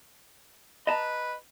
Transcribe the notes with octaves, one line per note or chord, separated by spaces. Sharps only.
B4 D#5 A5 A#5